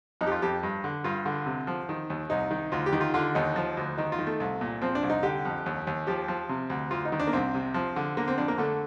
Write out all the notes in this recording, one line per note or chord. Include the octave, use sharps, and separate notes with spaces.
F2 D#4
G4
F4
F2 G4
G2
D3
G2 F4
D3
C3
F3
D#3
D#2
C2 D#4
D#3
D2 F4
G4
D#3
F4
D3 F4
D#2 D#4
F3
D2
D#3 D#4
F4
D#3
A3
C2
A#2
F3 C4
D4
C2
D#4
D3 G4
F2
D#2
D#2
F3 G4
F3
C3
D2
D2 F4
D#4
D#3
D4
A#3
C2 C4
C3
F3
D3
D3 A#3
C4
F2 D4
A#3
D3 A3